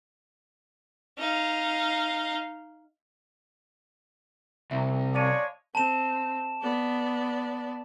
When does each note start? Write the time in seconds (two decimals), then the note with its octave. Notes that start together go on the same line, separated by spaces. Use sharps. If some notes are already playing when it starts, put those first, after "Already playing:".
1.18 D#4 F5
4.71 C2 E5
5.14 G#3 C#5 D5 F5 A5 D#7
5.75 C4 A5 E7
6.61 B3 D5